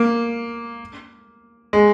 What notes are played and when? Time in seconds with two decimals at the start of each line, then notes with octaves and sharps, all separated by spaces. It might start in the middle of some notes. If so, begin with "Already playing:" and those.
Already playing: A#3
1.73 G#3